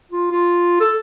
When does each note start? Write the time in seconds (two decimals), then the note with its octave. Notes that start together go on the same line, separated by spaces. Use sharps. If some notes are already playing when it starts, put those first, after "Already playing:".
0.12 F4
0.32 F4
0.80 A4